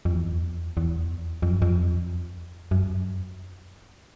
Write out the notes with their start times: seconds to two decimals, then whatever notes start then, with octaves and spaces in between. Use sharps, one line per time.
0.05 F2
0.13 E2
0.77 E2
1.42 F2
1.51 F#2
1.62 F2
2.71 F#2